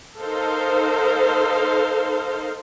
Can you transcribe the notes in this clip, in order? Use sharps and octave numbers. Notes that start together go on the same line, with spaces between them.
D#4 A4 A#4 C5 F5